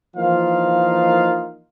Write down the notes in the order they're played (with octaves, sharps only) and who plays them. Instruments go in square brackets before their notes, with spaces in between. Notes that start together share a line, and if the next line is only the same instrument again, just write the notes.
[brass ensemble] E3 F3 A#3 D#4 F4 F5